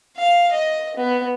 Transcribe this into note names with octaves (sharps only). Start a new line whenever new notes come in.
F5
D#5
B3